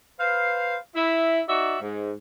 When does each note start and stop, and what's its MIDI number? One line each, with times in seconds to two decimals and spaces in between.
0.19 0.76 71
0.19 0.76 72
0.19 0.76 77
0.95 1.41 64
1.48 1.76 63
1.48 1.76 66
1.48 1.76 74
1.48 1.76 76
1.81 2.12 44